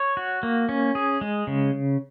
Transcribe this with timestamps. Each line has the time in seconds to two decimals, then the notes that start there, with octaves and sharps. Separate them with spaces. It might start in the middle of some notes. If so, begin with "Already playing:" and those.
Already playing: C#5
0.17 F#4
0.43 A#3
0.69 C#4
0.95 G#4
1.21 G#3
1.47 C#3